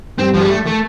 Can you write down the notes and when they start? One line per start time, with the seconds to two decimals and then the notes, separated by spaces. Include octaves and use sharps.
0.18 G2 C4
0.34 F3
0.41 G3
0.48 A3
0.66 A3